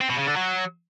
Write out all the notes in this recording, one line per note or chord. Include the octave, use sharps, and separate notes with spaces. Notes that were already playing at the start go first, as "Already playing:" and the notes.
C4
B2
C#3
D3
F#3